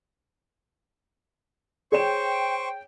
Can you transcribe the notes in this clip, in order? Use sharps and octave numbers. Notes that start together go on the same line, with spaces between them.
G#4 C5 C#5 G5 C#6 E7